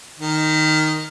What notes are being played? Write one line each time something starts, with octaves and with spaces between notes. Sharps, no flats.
D#3